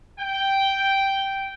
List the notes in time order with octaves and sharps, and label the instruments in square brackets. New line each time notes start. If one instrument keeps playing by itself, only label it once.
[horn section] G5